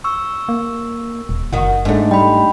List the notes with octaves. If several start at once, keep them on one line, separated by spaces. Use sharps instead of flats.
C#6 E6
A#3
D#1
F#1 D#3 F#4
G#2 G#3 A3 D4 D#4
G3 G5 B5